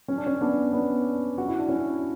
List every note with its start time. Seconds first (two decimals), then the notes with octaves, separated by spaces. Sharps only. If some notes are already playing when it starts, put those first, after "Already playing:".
0.08 C#4
0.18 D4
0.26 C#4
0.41 B3 D4
0.73 B3 D4
1.38 F#4
1.48 E4
1.59 D4
1.68 C#4 E4